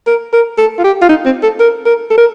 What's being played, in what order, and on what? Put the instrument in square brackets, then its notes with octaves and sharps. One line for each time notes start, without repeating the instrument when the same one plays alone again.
[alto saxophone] A#4
A#4
A4
F4
G4
F4
D#4
C4
A4
A#4
A#4
A4
A#4